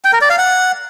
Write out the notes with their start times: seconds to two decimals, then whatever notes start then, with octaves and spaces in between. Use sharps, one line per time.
0.04 G5
0.13 A#4
0.21 D5
0.30 F5
0.38 F#5